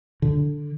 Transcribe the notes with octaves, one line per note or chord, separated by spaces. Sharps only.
D3